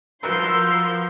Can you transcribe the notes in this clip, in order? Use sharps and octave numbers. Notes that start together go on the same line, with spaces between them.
F3 F#4 A#4 B4 C6 E6 G6